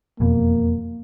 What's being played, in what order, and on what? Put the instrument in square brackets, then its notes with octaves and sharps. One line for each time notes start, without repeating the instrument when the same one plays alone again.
[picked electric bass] E1 F2 B2 [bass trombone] A#3